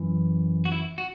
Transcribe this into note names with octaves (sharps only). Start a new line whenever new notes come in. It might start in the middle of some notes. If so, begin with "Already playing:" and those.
Already playing: F#2 E3
F#4
E4
F#4